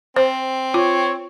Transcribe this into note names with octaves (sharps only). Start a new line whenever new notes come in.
C4 C5
F4 C#5